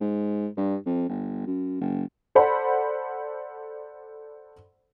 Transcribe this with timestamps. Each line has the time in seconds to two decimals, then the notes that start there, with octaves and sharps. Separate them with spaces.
0.01 G#2
0.57 G2
0.86 F2
1.09 G1
1.47 F#2
1.81 F#1
2.35 A4 C5 D5 F#5 B5